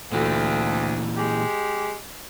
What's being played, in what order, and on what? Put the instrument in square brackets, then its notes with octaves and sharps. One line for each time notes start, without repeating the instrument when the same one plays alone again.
[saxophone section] D2 [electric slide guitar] A#2 E3
[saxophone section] G#3 G4